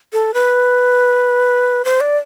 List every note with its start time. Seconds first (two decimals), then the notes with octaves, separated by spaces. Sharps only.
0.13 A4
0.34 B4
1.85 C5
2.01 D5